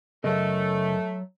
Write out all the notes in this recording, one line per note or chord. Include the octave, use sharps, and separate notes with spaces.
F#2 C#3 F#3 A3 A#4 D#5